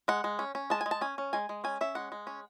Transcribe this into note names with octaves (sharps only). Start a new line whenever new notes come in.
G#3 F#5
G#3
C#4
C#4
G#3 A5
G#5
G#3
A5
C#4 G#5
C#4
G#3 G#5
G#3
C#4 G#5
C#4 E5
G#3 F#5
G#3
C#4